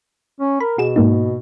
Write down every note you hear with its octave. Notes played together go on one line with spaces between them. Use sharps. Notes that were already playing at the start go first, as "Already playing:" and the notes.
C#4
A#4 B5
B2 F#4 G#4 E7
G#2 A#3 D#4